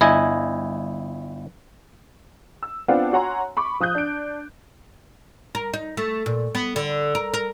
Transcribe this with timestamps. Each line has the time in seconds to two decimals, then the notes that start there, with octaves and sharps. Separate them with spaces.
0.01 G1 E4 D#5 G#5
2.63 E6
2.88 B3 C4 D4 F4 F#5 G5
3.13 F#4 C#5 F#5 G#5 A#5 C6
3.57 B5 C#6 D6
3.80 F3 D#6 F#6 G6
3.95 D4 D7
5.55 A#4
5.73 D#4
5.97 A3
6.26 A#2
6.55 B3
6.76 D3
7.15 A#4
7.34 A#4